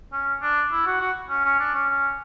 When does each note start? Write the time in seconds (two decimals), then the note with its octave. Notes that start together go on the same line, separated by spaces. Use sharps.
0.12 C#4
0.42 D4
0.71 E4
0.86 F#4
1.01 F#4
1.30 C#4
1.44 C#4
1.59 D4
1.74 C#4
1.89 C#4